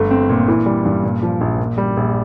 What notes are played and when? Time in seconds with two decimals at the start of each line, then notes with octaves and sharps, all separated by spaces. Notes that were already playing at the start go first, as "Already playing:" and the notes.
Already playing: G1 A3
0.11 C4
0.29 A#2
0.48 E3
0.66 G3
0.85 G2
1.03 A#2
1.22 F3
1.41 A#1
1.59 A#2
1.78 G3
1.97 A#1